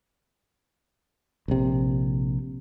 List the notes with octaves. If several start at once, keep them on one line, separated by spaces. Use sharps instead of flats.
A#1 C3